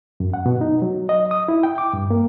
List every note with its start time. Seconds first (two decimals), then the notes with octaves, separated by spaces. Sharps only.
0.20 F#2
0.34 F#5
0.46 B2
0.61 D#4
0.82 F#3
1.09 D#5
1.31 D#6
1.48 E4
1.63 G5
1.78 D6
1.93 G2
2.10 A#3